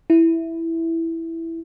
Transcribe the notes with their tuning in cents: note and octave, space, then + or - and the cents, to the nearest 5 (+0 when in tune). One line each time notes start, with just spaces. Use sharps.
E4 +0